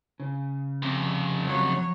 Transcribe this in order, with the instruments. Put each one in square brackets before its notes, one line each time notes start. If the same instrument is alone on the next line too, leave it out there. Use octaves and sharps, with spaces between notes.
[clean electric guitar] C#3
[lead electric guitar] F2 C3
[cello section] F3 F#3 C#5